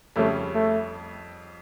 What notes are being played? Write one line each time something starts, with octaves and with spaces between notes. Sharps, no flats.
F2 C#3 G3 A3 C#4
A3